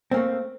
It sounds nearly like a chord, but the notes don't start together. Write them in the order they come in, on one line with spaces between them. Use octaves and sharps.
C4 A#3 A3